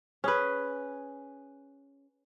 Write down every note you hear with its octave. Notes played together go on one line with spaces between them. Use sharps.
C#4 G#4 B4